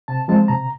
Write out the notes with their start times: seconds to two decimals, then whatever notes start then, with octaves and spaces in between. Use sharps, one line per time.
0.08 C3 A5
0.28 F3 G#3 C4 A5
0.48 C3 A#5